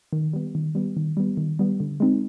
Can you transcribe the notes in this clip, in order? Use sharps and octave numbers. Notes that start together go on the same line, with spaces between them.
D#3
G3 B3
D#3
G3 B3
D#3
G3 B3
D#3
G3 B3
D3
G#3 C4 D#4